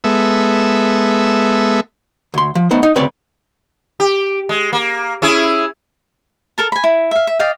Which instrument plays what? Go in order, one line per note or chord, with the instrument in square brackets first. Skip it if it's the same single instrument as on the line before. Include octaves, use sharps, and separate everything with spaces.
[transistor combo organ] G#3 B3 A4 E5
[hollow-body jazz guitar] D2 C6
F3
A3 B3 D#4 C5
D#4
D2 C#3 C4 B4 C#5 D5
[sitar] G4
G#3
A#3
C#4 E4 G#4
[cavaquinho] A4 A#4 A5
G#5 B5
E4
E5 F5
E5
D5 D#5 F5 G5